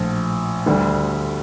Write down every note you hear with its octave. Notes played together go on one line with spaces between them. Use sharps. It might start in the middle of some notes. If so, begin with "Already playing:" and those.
Already playing: A#1 A2 F3
D2 D3 G3